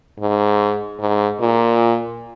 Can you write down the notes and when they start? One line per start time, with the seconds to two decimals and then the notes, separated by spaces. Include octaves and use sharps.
0.20 G#2
1.00 G#2
1.41 A#2